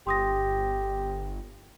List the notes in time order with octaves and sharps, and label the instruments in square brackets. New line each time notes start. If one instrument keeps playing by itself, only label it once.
[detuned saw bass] G1 [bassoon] G4 [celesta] C6 D#6 A#6